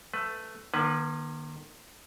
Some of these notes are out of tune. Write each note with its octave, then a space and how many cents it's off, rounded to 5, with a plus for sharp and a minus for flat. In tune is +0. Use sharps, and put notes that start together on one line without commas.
A3 +0 B4 +15
D#3 -40 A#3 +30 B4 +0